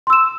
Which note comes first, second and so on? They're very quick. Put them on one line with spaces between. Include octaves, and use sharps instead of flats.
C6 E6 E7